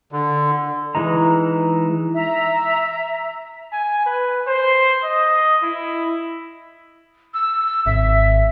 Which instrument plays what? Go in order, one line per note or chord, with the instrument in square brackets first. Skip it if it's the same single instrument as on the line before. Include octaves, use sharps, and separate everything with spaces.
[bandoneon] D3
[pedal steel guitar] E3 G#3 D#4 A#5
[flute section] E5 A#5
[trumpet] G#5
B4
C5
D#5
E4
[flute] E6
[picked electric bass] G#1 [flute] E5